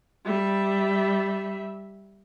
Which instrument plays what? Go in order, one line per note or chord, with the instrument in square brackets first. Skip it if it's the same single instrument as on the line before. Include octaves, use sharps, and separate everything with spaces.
[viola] G3 E5